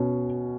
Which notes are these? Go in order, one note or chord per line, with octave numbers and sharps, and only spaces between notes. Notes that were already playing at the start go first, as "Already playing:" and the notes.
Already playing: B2 C#4